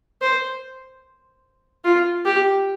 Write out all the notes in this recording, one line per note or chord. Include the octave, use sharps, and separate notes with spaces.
C5
F4
G4